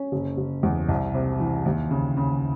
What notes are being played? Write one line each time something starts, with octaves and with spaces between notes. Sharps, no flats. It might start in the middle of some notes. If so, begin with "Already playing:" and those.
Already playing: C#4
F#1
F#1
E2
C2
C3
E3
D#2
C#3
C#3